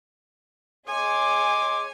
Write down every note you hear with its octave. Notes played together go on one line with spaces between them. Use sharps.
G#4 C#5 D#5 G#5 C6 D6